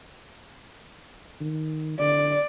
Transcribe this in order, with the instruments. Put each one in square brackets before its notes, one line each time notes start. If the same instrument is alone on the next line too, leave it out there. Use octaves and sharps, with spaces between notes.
[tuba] D#3
[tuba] D3 [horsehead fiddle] D5